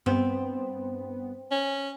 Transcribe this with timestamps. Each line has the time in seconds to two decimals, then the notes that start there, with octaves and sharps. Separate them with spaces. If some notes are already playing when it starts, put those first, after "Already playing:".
0.06 G2 B3 C4
1.51 C#4